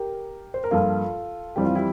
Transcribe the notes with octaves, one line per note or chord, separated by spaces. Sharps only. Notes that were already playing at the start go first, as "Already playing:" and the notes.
Already playing: G4 A#4
C5
A#4
G2 F3 A#3 F4 A4
F2 E3 G3 C4 G4
F4
E4 G4